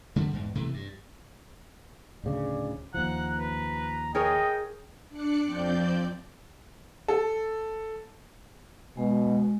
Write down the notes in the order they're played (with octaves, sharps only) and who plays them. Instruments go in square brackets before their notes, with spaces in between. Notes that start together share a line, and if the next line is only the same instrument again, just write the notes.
[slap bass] D3 G3 A3
E2 G#2
C3 E3 A3
G2
[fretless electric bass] D1 D2 C#3 [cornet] D5
[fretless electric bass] D#2 F3 [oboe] F#5 [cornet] A#5
[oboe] B4
[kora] G#4 A#4 C#5 [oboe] D#5 [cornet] G5
[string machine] D4 D5 F#6 C#7
F2 F3 C4 D5 G6
[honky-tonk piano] A4
[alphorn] B2 [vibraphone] G#3